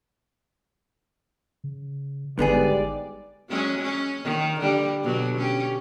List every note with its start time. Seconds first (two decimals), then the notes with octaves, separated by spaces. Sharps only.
1.64 C#3
2.39 G#1 G#2 D3 G3 B3 G#4 D5
3.49 F#3 G#3 C#4
3.82 C#4
4.24 D#3
4.60 D3 G3
5.04 B2 D3 F#3
5.37 C#4 G4